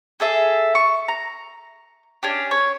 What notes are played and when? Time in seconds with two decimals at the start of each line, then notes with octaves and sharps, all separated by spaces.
0.20 G#4 A4 E5
0.75 C#6
1.08 A#5
2.23 C#4 D4 G4
2.51 C#5